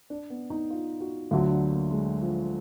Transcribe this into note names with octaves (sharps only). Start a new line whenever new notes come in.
D4
B3
D#4
F4
F#4
D2 D3 F#3 F4
D4
A#3
G#3
F3